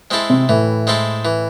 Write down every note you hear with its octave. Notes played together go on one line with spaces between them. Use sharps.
G#3 C4 E4 A4
C3
A2 E3
G#3 C4 E4 A4
E3